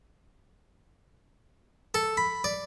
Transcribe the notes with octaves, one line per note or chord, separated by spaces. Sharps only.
A4
B5
D5